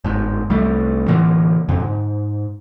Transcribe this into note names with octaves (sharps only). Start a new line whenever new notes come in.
G1 G#2
C2 G3 A3
A2 D3 E3 A#3
F2 D3
G#2